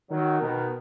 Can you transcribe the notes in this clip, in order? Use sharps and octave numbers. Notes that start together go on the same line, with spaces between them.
D#3 F#3
B2 D#3